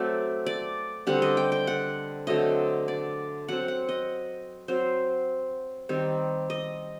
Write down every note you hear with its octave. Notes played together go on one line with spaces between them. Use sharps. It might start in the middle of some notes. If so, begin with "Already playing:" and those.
Already playing: F#3 A3 C4 D5
D5
D3 G3 C4 F#5
D#5
G5
G5
F#5
D3 F#3 A3 C4 D#5
D5
F#3 C4 F#5
F#5
D#5
F#3 C4 C5
D#3 G3 C4
D#5